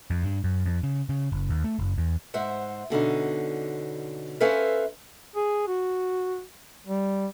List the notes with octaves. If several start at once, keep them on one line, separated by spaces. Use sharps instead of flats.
F2
G2
F#2
F2
C#3
C#3
F#1
D#2
A3
F#1
E2
G#2 C5 E5 F#5
B2 D3 C#4 D#4
C#4 A4 B4 C5 E5 F5
G#4
F#4
G3